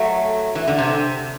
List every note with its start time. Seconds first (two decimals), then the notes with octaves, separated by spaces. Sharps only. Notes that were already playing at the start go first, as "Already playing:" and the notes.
Already playing: F#3 A3
0.55 E3
0.68 D3
0.79 C3